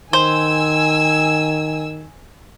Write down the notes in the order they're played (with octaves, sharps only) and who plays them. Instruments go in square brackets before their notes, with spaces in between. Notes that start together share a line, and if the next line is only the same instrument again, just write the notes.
[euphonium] D#3 [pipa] C5 [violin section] G#5 E6